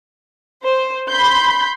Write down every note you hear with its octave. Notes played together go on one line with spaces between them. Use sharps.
C5
B5 C6 G6